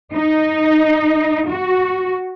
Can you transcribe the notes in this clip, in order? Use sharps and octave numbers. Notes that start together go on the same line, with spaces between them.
D#4
F#4